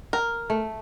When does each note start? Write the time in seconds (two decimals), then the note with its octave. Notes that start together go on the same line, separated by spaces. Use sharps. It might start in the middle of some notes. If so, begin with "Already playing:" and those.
0.13 A#4
0.50 A3